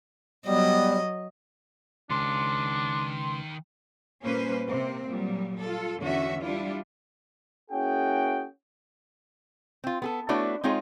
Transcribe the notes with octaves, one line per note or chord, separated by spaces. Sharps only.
F#3 G3 B3 D#5
C#2 D#3 D4 F5 C6
A#2 G3 A#3 C#4 B4 C5
C3 A#3 C4
A#2 F#3 G3
F4 A4
E2 D3 C#4 F#4 E5
G3 D4 E4 F4
A#3 C#4 E4 F#4 G#4 G5
C4 F4
B3 G#4 A4
A3 B3 D4 E4 F#4 C#5
G#3 C4 D#4 F4 G#4 C#5